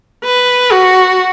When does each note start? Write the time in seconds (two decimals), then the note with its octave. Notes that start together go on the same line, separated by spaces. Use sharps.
0.25 B4
0.72 F#4